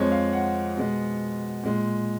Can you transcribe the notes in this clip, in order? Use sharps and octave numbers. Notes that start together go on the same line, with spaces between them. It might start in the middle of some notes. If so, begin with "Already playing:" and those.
Already playing: F2 F3 G#3 C#5
F5
F#5
B2 G#3
A#2 G#3